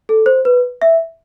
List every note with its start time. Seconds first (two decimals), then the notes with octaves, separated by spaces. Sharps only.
0.09 A4
0.26 C5
0.45 B4
0.82 E5